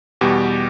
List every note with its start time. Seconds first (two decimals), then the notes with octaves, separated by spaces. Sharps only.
0.21 E2 B2 G3 G4